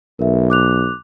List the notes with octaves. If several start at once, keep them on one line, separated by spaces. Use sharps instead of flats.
B1 A#4 E5
D6 F#6 F7